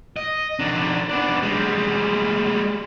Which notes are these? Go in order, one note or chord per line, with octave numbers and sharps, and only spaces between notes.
D#5
D#3 D4
B3 D4
G3 G#3